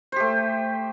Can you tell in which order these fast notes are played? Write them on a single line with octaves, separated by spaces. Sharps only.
C5 G4 A3